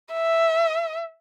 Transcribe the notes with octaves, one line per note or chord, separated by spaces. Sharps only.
E5